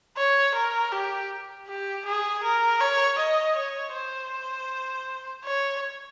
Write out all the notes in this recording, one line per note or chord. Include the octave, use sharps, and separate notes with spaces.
C#5
A#4
G4
G4
G#4
A#4
C#5
D#5
C#5
C5
C#5